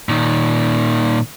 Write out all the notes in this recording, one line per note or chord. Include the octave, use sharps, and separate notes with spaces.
A#2 D#3